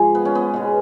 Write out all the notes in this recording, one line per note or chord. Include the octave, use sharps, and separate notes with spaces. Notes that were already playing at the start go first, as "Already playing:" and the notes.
Already playing: G#2 F3 G#3 G#4
B3
C#4
B3
B2 G#3